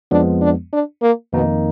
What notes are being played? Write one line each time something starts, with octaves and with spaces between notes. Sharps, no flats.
F2 F3 G#3 B3 D4
D4
D4
A#3
F2 B2 D#3 A#3 D#4